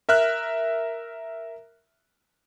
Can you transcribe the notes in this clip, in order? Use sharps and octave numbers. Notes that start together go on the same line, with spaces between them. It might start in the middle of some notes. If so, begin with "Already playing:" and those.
A#4 E5 F6 F#6